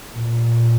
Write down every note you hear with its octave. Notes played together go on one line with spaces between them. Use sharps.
A#2